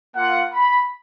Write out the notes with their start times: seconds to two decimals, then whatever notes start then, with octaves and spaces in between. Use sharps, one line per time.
0.16 A#3 F4 F#5
0.53 B5